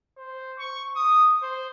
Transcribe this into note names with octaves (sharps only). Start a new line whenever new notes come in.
C5
C#6
D#6
C5